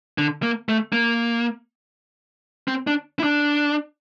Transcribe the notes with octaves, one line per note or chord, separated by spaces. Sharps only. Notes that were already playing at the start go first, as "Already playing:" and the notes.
D3
A#3
A3
A#3
C4
D4
E4
D4